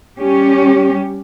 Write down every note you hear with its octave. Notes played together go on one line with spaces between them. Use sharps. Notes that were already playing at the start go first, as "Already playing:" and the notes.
G3 C#4 G4